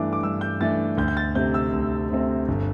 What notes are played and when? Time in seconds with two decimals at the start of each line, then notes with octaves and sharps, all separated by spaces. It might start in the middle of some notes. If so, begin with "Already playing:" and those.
Already playing: G2 E3 A3 D4 D6
0.13 D6
0.23 G2 E6
0.41 G6
0.61 E3 A3 D4 A6
0.97 D2 G6
1.08 G6
1.17 A6
1.35 C3 A3 C4 G6
1.54 E6
1.73 D2
2.10 C3 A3 C4
2.48 G1